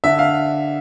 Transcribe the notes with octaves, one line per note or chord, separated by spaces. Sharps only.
D3 E5
F5